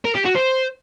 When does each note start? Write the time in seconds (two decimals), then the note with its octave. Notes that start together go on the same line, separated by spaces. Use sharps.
0.05 A#4
0.15 G4
0.25 F#4
0.35 C5